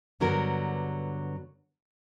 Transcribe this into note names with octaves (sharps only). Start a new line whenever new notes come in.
G2 D3 F#3 B3 A#4